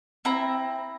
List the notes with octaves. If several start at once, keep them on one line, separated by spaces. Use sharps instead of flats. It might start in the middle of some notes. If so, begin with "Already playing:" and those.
C4 E4 A#5